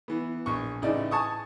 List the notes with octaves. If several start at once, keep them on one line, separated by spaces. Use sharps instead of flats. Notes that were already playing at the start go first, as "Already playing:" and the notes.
E3 B3
A#1 C#6
A1 C#3 D#4 E4 D5
G#5 A5 C#6 D#6